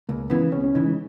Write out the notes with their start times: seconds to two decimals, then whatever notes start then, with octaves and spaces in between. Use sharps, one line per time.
0.09 C#2 A#3
0.30 C#3 E3 B3
0.52 C#2 C#4
0.64 C#4
0.74 C#3 E3 D#4
0.86 G#3